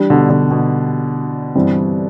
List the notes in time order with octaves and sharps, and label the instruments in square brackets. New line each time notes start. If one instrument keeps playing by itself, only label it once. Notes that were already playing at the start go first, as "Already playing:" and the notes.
Already playing: [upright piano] E3 G3 D4 G4
[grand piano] B2 D3
B2 D3
B2
[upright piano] G2 E3 G3 C4